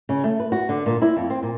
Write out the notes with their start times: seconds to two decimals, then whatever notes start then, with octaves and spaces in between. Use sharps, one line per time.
0.09 C#3
0.24 A3
0.40 B4
0.52 F#4
0.69 D3
0.86 A#2
1.02 E4
1.17 F2
1.30 C4
1.43 A#2